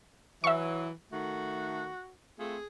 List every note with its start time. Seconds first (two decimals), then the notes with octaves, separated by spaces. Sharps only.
0.44 E3 F#3 E5 C#6
1.12 D#3 A3 F#4
2.39 A3 C4 F4 G#4